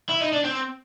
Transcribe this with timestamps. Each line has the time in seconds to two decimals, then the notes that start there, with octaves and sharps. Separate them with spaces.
0.09 E4
0.21 D#4
0.32 D4
0.44 C4